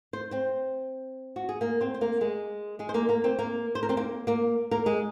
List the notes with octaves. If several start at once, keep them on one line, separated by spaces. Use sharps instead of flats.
C5
C4 C5
F#4
G#4
A#3 A#4
C4 C5
C5
A#3 A#4
G#3 G#4
G#3 G#4
C5
A#3 A#4
A#3 A#4
C4 C5
A#3 A#4
C5
A#4
C4 C5
A#3 A#4
A#3 A#4
A#3 A#4
G#3 G#4